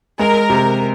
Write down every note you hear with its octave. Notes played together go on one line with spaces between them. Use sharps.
G#3 A#4
C3